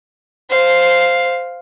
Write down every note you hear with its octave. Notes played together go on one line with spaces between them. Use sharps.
C5 F5